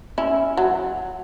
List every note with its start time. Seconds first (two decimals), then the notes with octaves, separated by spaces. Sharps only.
0.18 C#4 E4
0.57 F#3